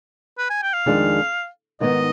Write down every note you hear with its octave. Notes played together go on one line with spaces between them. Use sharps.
B4
G#5
G5
F5
F2 D#3 G#3 D4 G#4
G#2 D#3 B3 D#4 D#5